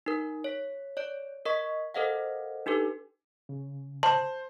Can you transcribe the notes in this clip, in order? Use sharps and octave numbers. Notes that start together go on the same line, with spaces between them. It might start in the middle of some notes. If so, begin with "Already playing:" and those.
D#4 A#4
C#5 B6
C#5 D5 D7
A#4 D#5 C#6 B6
A4 A#4 C5 D#5 F5 F#5
D4 D#4 G4 A4 B4
C#3
C5 A5